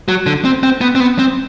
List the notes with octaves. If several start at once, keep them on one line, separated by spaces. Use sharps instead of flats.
F#3
D3
C4
C4
B3
C4
B3
C4